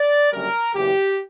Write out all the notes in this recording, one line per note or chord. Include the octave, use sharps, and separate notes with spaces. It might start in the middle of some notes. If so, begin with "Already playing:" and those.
Already playing: D5
F#1 F#2 D3 G3 A#4
F#1 E2 C#3 G4